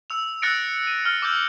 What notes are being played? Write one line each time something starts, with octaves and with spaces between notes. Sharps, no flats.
E6 F7
E6 F#6 A6 A#6 C#7 D7
D#7
F6
D6 E6 G6 F#7